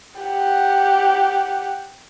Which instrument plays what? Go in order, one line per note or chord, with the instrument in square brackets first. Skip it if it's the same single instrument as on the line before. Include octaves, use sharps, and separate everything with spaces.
[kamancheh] G4 F#5